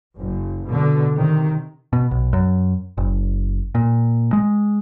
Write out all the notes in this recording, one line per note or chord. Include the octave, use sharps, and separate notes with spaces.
F#1
B2 D3
C3 D#3
B2
B1
F#2
F#1
A#2
G#3